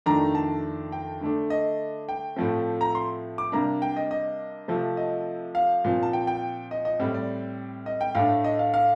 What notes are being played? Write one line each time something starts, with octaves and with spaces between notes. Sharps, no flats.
F2 D#3 A3 D4 A#5
A5
G5
D3 A3 D4
D#5
G5
A2 F3 A3 C4
A#5
C6
D6
C3 G3 A#3 D4 A#5
G5
D#5
D#5
C3 F3 A3 C4
D#5
F5
A#2 F3 C4
A5
G5
G5
D#5
D#5
A2 G3 C4
D5
D#5
G5
A2 A3 D4 F5
D#5
F5
F5